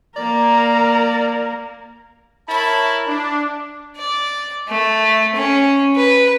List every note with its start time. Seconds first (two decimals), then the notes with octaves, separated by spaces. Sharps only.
0.16 A#3 A#4 D5
2.49 E4 A#4 C#5 A5 B5
3.07 D4
3.97 D5
4.68 A3
5.35 C#4
5.96 B4